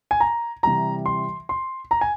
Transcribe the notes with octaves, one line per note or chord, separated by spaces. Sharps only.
G#5
A#5
C3 E3 G3 A#5
C6
C6
A#5
G#5